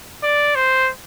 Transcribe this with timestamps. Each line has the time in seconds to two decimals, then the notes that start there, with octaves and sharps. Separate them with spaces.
0.23 D5
0.55 C5